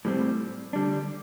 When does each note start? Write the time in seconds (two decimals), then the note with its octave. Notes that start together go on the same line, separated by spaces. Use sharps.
0.05 A2 G3 C4
0.73 D3 G3 D4